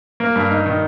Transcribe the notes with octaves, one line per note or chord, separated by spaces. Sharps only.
A#3
G2
D#4
D#3